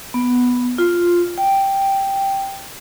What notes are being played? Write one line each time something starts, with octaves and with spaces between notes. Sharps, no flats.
B3
F4
G5